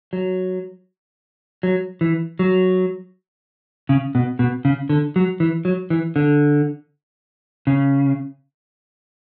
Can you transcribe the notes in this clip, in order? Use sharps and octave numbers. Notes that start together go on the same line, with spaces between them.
F#3
F#3
E3
F#3
C#3
B2
B2
C#3
D3
F#3
E3
F#3
E3
D3
C#3